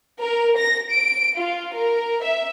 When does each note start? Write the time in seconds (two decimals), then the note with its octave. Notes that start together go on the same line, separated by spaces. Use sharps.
0.19 A#4
0.57 A#6
0.89 D7
1.35 F4
1.73 A#4
2.22 E5